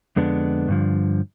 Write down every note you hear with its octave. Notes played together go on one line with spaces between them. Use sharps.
F2 D3 G#3 B3 D4
G2 D3 F3